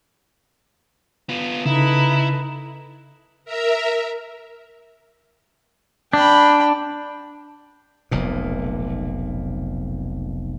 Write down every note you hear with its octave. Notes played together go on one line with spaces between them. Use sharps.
B3 F4
C#3 D#4 E4 A4 B4
A#4 E5 A#5
D4 G5 B5
F1 B1 A#2